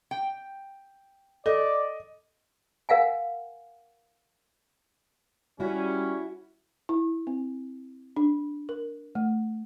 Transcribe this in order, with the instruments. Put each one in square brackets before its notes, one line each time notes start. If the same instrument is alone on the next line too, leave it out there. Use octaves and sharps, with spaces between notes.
[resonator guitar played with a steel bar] G5
[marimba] A4 [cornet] D5 [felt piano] D#5
[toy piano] A#4 F5 F#5 G#5
[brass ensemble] G3 C#4 [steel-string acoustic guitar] E4 F#4
[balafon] E4
C4
D4
A#4
A3